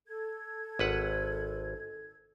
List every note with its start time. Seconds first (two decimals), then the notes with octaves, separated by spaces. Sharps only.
0.07 A4 G#6
0.79 G#1 B4 F#5